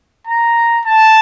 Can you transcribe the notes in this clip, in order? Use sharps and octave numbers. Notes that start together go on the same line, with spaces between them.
A#5
A5